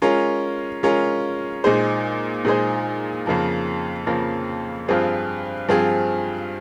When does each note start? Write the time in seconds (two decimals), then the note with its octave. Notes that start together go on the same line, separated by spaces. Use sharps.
0.02 G#3 C#4 F4 A#4
0.83 G#3 C#4 F4 A#4
1.64 A#2 G#3 D#4 G#4 C5
2.45 A#2 G#3 D#4 G#4 C5
3.26 F2 C#3 F3 A#3
4.06 F2 C#3 F3 A#3
4.88 G2 F3 C4 F4 G#4
5.68 G2 F3 C4 F4 G#4